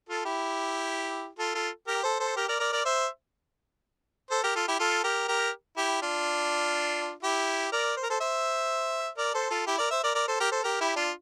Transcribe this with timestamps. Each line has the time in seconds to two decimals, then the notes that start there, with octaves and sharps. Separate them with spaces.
0.09 F4 A4
0.25 E4 G4
1.39 F4 A4
1.55 F4 A4
1.87 G4 A#4
2.03 A4 C5
2.19 A4 C5
2.36 G4 A#4
2.48 A#4 D5
2.60 A#4 D5
2.72 A#4 D5
2.85 C5 E5
4.30 A4 C5
4.43 G4 A#4
4.55 F4 A4
4.68 E4 G4
4.79 F4 A4
5.04 G4 A#4
5.28 G4 A#4
5.76 E4 G4
6.02 D4 F4
7.23 E4 G4
7.72 A#4 D5
7.96 C5
8.03 A#4
8.10 A4 C5
8.20 C5 E5
9.17 A#4 D5
9.34 A4 C5
9.50 F4 A4
9.67 E4 G4
9.78 A#4 D5
9.91 C5 E5
10.03 A#4 D5
10.15 A#4 D5
10.28 A4 C5
10.40 G4 A#4
10.51 A4 C5
10.63 G4 A#4
10.81 E4 G4
10.96 D4 F4